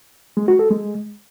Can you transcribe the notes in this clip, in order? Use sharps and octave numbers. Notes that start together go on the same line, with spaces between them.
G#3
F#4
A4
G#3